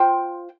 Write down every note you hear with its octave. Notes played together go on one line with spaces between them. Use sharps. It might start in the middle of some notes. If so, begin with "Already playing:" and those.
Already playing: F4 C5 G5